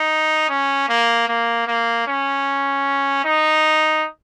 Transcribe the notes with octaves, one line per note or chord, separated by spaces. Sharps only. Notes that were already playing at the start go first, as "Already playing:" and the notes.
Already playing: D#4
C#4
A#3
A#3
A#3
C#4
D#4